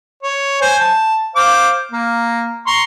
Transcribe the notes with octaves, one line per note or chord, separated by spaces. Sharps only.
C#5
C5 G#5
A5
C5 F5 D6
A#3
A#5 C6 C#6